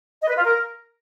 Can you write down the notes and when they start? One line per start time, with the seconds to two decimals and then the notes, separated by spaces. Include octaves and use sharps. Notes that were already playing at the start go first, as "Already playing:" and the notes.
0.22 D#5
0.29 B4
0.37 F4
0.44 A#4